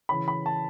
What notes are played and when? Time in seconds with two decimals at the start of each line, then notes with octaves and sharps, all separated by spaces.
0.09 C#3 E3 C#4 B5
0.28 B5
0.46 A5